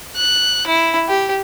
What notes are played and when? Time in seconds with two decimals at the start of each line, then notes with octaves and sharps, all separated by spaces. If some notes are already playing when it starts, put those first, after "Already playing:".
0.16 F#6
0.67 E4
1.09 G4